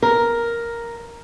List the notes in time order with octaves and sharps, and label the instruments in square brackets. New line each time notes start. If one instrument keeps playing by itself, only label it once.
[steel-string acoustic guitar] A#4